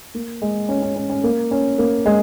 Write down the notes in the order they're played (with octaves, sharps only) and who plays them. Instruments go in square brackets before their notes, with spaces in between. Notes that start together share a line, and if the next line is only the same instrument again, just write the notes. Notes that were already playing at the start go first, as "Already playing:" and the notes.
[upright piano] A#3
G#3
C#4
C#4
C#4
C#4
A#3
C#4
A#3
G#3